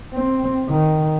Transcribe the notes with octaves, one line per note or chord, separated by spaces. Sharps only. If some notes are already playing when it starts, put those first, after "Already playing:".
C4
D#3